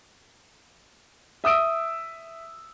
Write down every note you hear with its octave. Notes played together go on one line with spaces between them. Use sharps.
E5 D#6 E6 D7